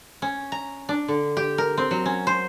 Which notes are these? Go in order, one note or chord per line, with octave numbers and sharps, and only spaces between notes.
C#4
A#5
D4
D3
G4
A#4
C4
F#3
C#4
C5